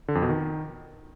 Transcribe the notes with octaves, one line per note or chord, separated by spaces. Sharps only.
D3
F2
B2
D#3